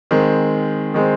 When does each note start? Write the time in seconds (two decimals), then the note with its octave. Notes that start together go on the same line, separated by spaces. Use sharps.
0.11 D#3 G#3 C4
0.94 D#3 G#3 C4